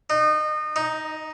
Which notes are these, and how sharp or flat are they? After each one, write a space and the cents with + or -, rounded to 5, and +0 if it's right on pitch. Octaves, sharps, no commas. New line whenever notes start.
D#4 -30
D#4 +5